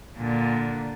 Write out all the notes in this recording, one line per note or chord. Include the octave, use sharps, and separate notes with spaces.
A#2 D3